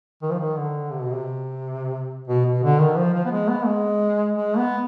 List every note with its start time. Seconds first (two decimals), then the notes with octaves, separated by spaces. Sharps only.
0.22 D#3
0.31 F3
0.39 D#3
0.57 D3
0.91 C3
1.02 B2
1.13 C3
2.28 B2
2.45 B2
2.63 D3
2.80 D#3
2.97 F3
3.14 F3
3.25 B3
3.31 G#3
3.48 B3
3.66 G#3
4.35 G#3
4.57 B3